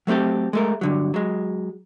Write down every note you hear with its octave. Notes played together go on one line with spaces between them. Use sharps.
F#3 A3 C4 G4 A4
G#3 A3 A#4
G2 D3 F#3
F#3 G#3